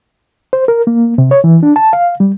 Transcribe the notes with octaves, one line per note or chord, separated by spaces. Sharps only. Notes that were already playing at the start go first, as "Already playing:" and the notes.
C5
A#4
A#3
C3
C#5
E3
D4
A5
F5
G3